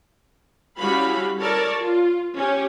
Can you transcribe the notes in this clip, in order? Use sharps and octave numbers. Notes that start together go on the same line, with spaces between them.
G3 C#4 E4 F#4 F5 B5
A4 A#4 C#5 D5 A5
F4
C#4 G4